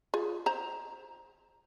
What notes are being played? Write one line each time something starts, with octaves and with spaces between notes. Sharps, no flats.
F4 G#4
C5 A#5